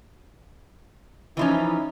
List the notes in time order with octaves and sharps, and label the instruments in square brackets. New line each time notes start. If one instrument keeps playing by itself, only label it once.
[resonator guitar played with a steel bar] E3 F3 C#4 [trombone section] D#4 E4